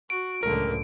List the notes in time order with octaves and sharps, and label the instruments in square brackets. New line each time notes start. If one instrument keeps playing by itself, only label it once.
[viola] F#4 [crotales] D7
[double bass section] C#2 F#2 A2 [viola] D3 A3 [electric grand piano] A#4